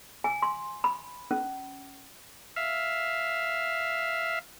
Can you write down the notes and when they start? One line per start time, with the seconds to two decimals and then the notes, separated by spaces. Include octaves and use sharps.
0.24 G#5
0.42 C6
0.84 B5
1.31 C#4
2.56 E5 F5